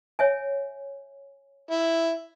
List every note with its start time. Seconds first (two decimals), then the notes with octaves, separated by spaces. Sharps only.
0.19 C#5 E5 G#5
1.71 E4